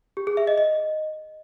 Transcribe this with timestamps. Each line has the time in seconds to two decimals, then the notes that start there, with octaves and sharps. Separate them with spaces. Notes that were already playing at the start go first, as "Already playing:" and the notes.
0.17 G4
0.27 G#4
0.37 E5
0.47 D#5
0.58 D#5